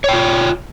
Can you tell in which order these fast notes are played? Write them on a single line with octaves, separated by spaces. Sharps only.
C#5 G5 F4